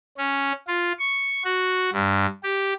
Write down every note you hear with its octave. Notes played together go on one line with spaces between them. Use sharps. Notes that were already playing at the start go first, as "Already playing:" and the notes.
C#4
F4
C#6
F#4
G2
G4